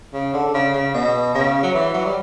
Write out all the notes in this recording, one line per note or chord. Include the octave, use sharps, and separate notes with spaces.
C#3
D3
D3
C#3
C#3
B2
C#3
F#3
E3
F#3
G3